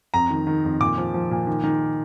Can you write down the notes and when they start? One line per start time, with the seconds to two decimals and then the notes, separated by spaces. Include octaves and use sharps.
0.14 F2 A#5
0.31 D#3
0.47 D#3
0.65 F2
0.81 A#2 D6
0.98 F3
1.14 F3
1.31 A#2
1.47 D#3
1.63 D#3